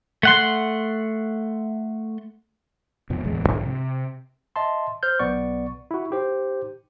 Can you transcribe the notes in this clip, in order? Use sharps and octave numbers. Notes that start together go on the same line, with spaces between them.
A3 F#5 C6
F2 B2 F3
D1 A1 E2 G#3
B1 G#2 D3 F3
C3
D#5 E5 A5 C6
C5 F6 G6
B1 B3 D5 C#6
E4 F#4
D#4 G4 C5